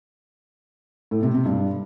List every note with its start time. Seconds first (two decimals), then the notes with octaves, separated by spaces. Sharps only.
1.11 A2
1.23 C3
1.34 C3
1.45 G2